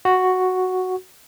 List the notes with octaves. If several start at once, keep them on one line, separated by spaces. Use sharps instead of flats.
F#4